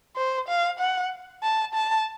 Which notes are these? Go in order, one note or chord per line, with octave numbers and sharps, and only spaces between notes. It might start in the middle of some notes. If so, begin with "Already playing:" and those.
C5
F5
F#5
A5
A5